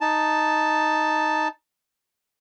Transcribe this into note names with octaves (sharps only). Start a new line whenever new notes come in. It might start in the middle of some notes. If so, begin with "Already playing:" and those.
D#4 A5